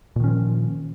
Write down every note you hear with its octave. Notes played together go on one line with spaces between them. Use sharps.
A#2 D#3 F3 C#4